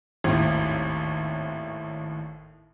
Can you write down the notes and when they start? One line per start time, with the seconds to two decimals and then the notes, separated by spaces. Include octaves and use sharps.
0.24 G#1 D#2 A2